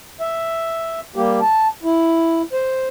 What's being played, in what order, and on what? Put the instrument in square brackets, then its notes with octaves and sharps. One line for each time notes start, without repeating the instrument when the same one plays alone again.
[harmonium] E5
G3 A#3 G4
A5
E4
C5